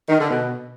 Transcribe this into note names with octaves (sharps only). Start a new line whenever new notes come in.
D#3
D3
B2